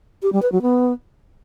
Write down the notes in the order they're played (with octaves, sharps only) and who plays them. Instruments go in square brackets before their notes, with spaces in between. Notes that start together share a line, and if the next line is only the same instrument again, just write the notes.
[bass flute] G4
G3
B4
F#3
B3